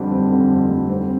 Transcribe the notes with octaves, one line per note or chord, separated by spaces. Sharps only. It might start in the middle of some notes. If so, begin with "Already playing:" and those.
Already playing: F2 D3 G3 C4
C4
D3
F2
G3
C4